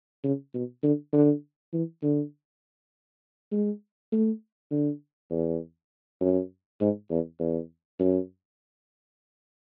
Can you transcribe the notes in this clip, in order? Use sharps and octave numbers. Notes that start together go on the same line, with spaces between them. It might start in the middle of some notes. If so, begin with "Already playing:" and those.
C#3
B2
D3
D3
E3
D3
G#3
A3
D3
E2
F#2
G#2
E2
E2
F#2